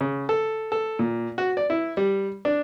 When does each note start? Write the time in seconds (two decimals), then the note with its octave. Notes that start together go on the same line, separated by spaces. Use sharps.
0.01 C#3
0.29 A4
0.72 A4
0.99 A#2
1.38 F#4
1.57 D5
1.70 E4
1.97 G3
2.45 D4